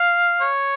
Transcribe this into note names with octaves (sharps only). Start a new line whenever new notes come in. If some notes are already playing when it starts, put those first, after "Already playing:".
Already playing: F5
C#5